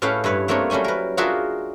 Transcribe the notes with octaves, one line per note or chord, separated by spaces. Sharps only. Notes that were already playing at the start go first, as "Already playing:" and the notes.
A2 C#4 A4 B4 F5 G5
G2 E4 B4 C#5
A3 A#3 C4 D4 A#4 C#5
F#3 G3 A3 C#4 G#5
A#4 B4
D4 F4 F#4 G#4 A#4 E5